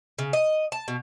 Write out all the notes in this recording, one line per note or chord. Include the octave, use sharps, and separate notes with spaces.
C#3
D#5
A5
B2